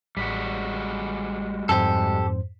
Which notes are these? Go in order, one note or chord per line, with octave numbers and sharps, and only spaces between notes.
A1 G3 G#3 F#4 B6
F2 G#2 G4 A4 C5